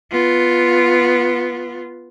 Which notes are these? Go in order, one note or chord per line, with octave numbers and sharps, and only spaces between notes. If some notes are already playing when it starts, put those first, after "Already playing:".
B3 F4